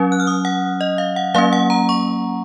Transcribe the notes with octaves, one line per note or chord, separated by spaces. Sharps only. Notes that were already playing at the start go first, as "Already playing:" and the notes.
Already playing: F#3 C#4
F#6
F6
D#6
F#5
D#5
F5
F#5
F#3 A#3 C#4 F5
F#5
A#5
C#6